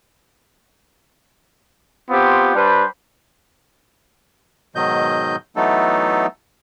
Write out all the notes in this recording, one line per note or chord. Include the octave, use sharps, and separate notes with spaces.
B3 C4 F4 G4
G3 D4 B4 C5
G#2 B2 D#3 F#3 D#5 G6
E3 F#3 A3 B3 D#4 A4